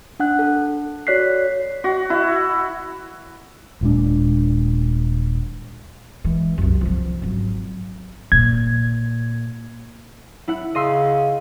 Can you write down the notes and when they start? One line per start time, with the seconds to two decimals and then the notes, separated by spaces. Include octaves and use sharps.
0.20 D4 F#5 F#6
0.39 A4
1.07 F#4 C#5 D5 F#6 B6 C7
1.84 F#4
2.10 E4
3.81 D#1 A#2 G#3 D4
6.24 E3 G#3
6.58 C2 F#2
6.81 D3 F3
7.22 G#1 F#3
8.32 A#2 G#6
10.48 E4 F#5
10.75 C#3 D#5 C6 E6